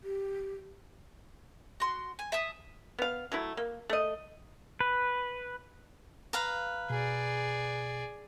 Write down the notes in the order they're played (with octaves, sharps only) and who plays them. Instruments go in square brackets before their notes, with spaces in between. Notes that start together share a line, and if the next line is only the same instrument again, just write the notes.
[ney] G4
[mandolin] F#4 C6
G#5
E5 A5 D#6
[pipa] B3 F5
F#3 A3 E4
A#3
A3 D#5
[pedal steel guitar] B4
[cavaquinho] B4 F5 A#5
[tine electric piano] B2 [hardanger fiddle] G#4 D5